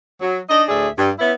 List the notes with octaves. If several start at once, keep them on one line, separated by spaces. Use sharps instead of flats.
F#3
D4 D#4 D#5
D2 A2 D4 G#4 E5
G2
B3 C#4 E4